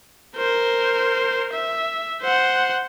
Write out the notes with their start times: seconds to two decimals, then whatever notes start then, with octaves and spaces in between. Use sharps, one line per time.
0.37 A#4 C5
1.53 E5
2.22 C5 F#5